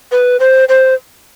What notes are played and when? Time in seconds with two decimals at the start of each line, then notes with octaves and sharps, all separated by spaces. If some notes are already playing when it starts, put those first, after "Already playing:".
0.12 B4
0.40 C5
0.69 C5